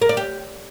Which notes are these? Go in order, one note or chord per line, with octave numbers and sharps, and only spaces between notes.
A#4
D5
G4